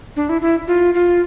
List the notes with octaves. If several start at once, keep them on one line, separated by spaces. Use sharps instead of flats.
D4
E4
E4
F4
F4